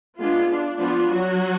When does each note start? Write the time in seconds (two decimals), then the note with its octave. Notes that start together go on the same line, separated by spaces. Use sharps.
0.18 G#3 B3 D4 F4
0.49 D4
0.78 F3 B3 D4 F4
1.09 F#3 F#4